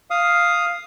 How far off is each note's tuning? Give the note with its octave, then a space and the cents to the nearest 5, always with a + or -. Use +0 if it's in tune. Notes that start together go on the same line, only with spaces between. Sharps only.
F5 +0 D#6 +0